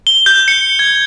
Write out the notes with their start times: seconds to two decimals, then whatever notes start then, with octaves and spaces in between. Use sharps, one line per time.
0.07 G7
0.26 G6
0.48 C#7
0.79 G#6